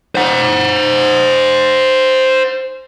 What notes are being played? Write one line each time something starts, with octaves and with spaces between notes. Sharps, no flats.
C5 F#5